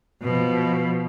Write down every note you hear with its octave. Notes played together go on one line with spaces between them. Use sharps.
B2 F3